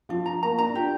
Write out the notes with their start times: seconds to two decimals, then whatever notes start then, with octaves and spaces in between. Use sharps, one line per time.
0.09 F3 D4
0.26 A#5
0.43 A#3 A#5
0.58 D4 A#5
0.69 D4
0.74 F4 G4